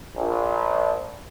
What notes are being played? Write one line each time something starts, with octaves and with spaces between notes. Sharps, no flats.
A#1